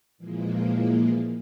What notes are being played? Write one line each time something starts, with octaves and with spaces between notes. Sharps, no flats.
A#2 E3 F3 G#3 A#3